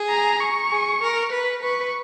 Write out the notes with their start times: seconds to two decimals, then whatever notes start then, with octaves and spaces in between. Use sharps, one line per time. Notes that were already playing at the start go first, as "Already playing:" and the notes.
Already playing: G#4
0.10 A#5
0.41 C#6
0.71 G#4
1.02 A#4
1.32 B4
1.63 B4 C#6